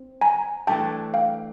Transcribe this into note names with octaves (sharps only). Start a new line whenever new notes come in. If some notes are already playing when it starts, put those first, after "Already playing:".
Already playing: C4
G#5 A#5
E3 A3 D4 G5 A5
F5 G5